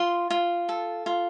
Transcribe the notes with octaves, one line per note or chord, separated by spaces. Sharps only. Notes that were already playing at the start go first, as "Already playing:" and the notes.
Already playing: F4 C6
F4
A4
F4